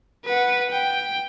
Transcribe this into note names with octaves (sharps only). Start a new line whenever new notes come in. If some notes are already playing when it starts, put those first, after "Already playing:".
B4 F#5
G5